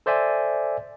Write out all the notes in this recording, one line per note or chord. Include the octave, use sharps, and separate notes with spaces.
A4 C5 D5 E5 G#5